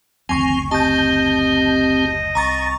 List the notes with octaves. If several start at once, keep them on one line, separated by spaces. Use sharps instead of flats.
F#1 D2 D#3 F3 C4 G#5 C#6
C4 G4 D#5 A5 G6
C2 G#5 A#5 C#6 A6